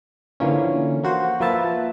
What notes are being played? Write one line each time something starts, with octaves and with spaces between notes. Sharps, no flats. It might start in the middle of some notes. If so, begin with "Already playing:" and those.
D3 E3 F3 A#3 C#4
A#3 F#4 C5
F3 A#3 B4 E5 A5